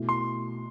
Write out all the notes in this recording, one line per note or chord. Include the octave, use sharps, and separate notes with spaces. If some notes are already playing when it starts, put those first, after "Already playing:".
Already playing: B2 A3 E4
C6